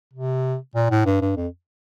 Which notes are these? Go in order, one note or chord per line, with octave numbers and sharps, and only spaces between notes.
C3
A#2
A2
G2
G2
F2